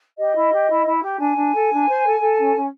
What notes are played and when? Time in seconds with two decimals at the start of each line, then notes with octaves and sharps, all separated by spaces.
0.18 G4 D#5
0.35 E4
0.52 G4
0.69 E4
0.85 E4
1.03 G4
1.19 D4 G#5
1.36 D4
1.54 A4
1.71 D4
1.87 C5
2.04 A4
2.21 A4
2.38 C#4
2.55 C#4